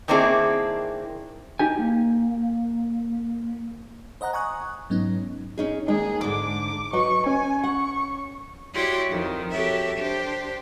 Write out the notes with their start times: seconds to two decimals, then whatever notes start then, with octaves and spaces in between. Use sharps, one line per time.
0.08 D#3 A#3 C4 D4 E4 G#4
1.59 D#4 G4 G#5
1.79 A#3
4.21 C5 D#5 F#5 A#5 F#6
4.33 G#5 A#5 C#6 D#6 F#6
4.90 G#2 F#3 B3 C#4 D#4
5.58 C#4 D#4 G#4
5.88 D#2 G#3 D#4 G#4
6.23 G#2 D3 D4 D6
6.93 F#3 B4 D#5 C#6
7.26 C#4 G#5
7.64 F#5 C#6
8.74 E4 F#4 G4 C#5 D5 C6
9.09 F2 D#3
9.51 F#4 G4 A4 C#5 E5
9.97 D4 G4 C5